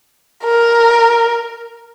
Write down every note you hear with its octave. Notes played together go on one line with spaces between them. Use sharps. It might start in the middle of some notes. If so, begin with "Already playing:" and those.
A#4